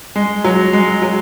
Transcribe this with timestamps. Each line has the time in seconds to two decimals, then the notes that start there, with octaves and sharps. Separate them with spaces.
0.16 G#3
0.44 F#3
0.73 G#3
1.02 F#3